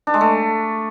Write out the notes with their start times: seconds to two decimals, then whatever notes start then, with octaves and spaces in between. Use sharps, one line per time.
0.07 D4
0.14 G#3
0.21 A3